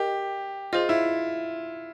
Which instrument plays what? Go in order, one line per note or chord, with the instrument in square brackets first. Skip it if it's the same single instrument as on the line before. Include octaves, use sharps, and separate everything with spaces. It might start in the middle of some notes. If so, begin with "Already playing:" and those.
Already playing: [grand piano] G4 [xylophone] A#4 D#5
[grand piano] F4 [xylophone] G#4 C5 D#5
[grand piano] E4